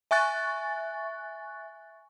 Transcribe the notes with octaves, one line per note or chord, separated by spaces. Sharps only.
E5 G#5 C#6 F#6 A6